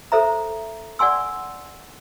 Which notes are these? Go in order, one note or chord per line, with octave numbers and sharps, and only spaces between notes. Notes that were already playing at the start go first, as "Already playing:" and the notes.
A4 C5 E5 A#5
D5 F#5 G#5 C6 E6